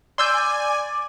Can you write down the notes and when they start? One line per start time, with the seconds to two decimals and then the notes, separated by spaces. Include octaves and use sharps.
0.18 D5 G#5 C6 E6 G6